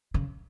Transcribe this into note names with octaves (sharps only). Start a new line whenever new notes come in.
C#3